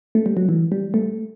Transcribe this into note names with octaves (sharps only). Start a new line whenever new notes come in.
A3
G3
F#3
E3
G3
A3